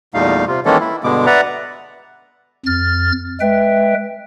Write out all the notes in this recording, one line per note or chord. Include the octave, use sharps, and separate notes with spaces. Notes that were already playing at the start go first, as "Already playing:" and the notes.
E2 A#2 G3 A3 D#4 F5
C3 F4
D#3 E3 G#3 A#3 C#4 A4
E4
G2 B2 D3 G#3 B3 D6
B4 D5 E5 F#5 A#5
F2 F6 A6
G#3 B4 E5 G5